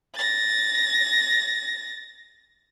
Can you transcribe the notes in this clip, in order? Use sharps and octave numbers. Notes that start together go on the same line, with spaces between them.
A6 A#6